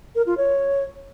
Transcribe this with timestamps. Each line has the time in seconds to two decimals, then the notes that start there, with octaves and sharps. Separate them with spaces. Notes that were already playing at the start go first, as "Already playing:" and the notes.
0.15 A#4
0.26 F4
0.37 C#5